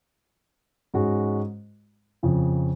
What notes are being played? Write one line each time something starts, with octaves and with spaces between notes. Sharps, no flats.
G#2 G#3 C#4 F#4
F2 C#3 F3